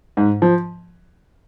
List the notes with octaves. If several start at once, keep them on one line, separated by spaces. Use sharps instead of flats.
G#2
F3